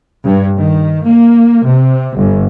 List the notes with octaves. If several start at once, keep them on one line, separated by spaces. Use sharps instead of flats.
G2
D#3
A#3
C3
G1